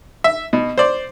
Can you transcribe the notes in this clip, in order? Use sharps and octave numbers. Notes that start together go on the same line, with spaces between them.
E5
B2
C5 D5